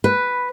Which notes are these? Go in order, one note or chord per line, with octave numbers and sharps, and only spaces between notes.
B4